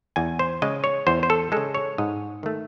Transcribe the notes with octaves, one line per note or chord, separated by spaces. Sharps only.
E2 G#5
C5
C#3 G#3 D#5
C#5
E2 C5
C5
A4
C#3 G#3 A4
C#5
G#2 D#5
D#3 A3